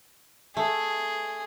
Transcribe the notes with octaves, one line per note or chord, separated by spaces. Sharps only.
A3 G#4